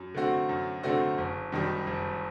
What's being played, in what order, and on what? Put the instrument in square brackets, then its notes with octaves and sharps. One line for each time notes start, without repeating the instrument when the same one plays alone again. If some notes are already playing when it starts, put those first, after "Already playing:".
Already playing: [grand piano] F#2
D3 A3 C4 F#4
F#2
D3 A3 C4 F#4
F#1
F#2 D#3 G3
F#1